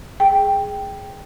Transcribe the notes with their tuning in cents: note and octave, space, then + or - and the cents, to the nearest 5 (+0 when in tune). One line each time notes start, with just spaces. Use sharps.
G#4 +0 G5 +0